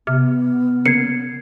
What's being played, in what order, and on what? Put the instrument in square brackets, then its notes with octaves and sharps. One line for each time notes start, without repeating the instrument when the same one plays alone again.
[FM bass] C3 [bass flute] B3 [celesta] F6
[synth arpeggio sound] C#3 A#3 [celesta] G#6 C7 C#7